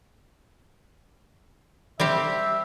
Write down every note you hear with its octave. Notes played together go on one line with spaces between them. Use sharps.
G3 C4 G4 E5